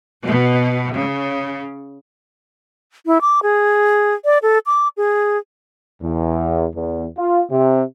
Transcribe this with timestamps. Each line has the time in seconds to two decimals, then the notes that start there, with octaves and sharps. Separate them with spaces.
0.24 B2
0.96 C#3
3.06 E4
3.21 D6
3.43 G#4
4.25 D5
4.43 A4
4.66 D6
4.97 G#4
6.02 E2
6.74 E2
7.18 F4
7.51 C3